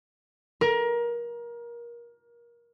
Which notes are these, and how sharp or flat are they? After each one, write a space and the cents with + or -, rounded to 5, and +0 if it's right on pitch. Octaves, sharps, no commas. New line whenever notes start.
A#4 +25